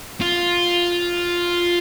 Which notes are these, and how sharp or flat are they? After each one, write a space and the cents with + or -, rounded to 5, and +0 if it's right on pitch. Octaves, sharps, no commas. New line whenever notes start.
F4 +5